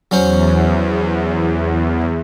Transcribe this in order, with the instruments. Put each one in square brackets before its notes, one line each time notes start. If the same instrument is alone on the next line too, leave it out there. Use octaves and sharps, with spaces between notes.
[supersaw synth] E2 [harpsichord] F#3 C#4 C5